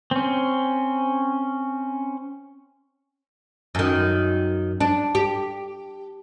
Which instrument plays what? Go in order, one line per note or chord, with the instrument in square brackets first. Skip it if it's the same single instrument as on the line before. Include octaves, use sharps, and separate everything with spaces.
[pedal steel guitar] C4 C#4
[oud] F#2 D#3
D4
G4